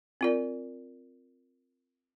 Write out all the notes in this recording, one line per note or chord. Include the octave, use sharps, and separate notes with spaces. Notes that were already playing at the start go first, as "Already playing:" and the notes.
C4 F4 A#4 D5